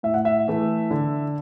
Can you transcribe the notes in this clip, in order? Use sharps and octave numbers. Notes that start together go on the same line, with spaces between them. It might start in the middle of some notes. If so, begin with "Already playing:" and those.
A2 E5
F#5
E5
E3 A3
D3